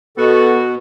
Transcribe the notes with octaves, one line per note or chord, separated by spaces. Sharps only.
B2 B3 F#4 A4